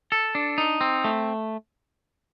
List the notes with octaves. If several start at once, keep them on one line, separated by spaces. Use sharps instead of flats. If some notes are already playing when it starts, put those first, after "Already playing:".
A4
D4
D#4
C4
A3